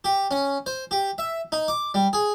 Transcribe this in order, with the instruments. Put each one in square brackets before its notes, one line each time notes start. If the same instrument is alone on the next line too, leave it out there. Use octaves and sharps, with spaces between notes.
[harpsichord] G4
C#4
C5
G4
E5
D#4
D6
G3
G#4